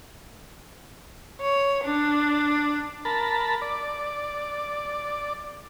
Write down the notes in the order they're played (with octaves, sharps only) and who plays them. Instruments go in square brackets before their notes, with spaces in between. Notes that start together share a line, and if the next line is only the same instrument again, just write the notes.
[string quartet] C#5
D4
[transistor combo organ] A#4 A5 B5
D5